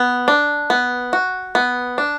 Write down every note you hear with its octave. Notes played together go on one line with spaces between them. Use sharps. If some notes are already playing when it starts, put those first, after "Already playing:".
Already playing: B3
D4
B3
F#4
B3
D4